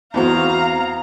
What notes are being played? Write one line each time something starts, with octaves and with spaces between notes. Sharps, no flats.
E2 C4 F#4 F5 A#5